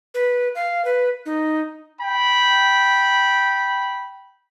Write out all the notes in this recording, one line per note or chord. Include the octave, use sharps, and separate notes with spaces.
B4
F5
B4
D#4
G5 B5